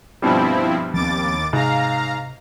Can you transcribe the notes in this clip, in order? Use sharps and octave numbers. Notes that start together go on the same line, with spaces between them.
G2 B2 F3 G3 C4 E4
D#2 F3 B3 C4 D6 A6
G#2 C3 F5 A#5